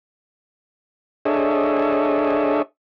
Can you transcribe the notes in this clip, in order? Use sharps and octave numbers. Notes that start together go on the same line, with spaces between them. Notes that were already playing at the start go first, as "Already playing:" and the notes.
D4 G#4 A4 C#5 D#5 E5